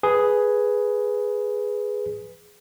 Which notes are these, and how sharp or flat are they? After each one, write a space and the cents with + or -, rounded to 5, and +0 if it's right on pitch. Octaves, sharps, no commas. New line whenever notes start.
G#4 +5 B4 +0